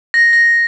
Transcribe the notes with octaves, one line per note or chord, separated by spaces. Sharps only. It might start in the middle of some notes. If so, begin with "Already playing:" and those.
A#6
A#6